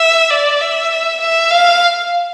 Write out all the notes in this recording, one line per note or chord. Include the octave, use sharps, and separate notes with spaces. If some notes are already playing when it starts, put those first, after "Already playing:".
Already playing: E5
D5
E5
E5
F5